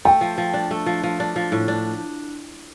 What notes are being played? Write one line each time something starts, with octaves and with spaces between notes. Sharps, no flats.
A3 G5
F3
F3
D4
A3
F3
F3
D4
F3
A2
D4